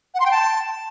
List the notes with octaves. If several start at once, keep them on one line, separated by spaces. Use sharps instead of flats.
F#5
C6
G5
A5